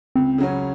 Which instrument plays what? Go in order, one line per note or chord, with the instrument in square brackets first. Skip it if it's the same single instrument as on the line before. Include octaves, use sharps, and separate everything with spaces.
[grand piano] C#2 [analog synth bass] C4
[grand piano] C#3 F#3 C#4